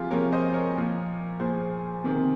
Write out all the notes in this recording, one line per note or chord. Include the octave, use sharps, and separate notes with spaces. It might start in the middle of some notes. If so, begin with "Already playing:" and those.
Already playing: C3 F3 F4 G4 G#4
C3 F3 A#4 C#5
C5 D#5
A#4 C#5
A#2 F3
A#2 F3 G#4 C5
C3 D#3